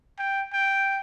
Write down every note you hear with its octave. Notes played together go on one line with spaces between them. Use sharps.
G5
G5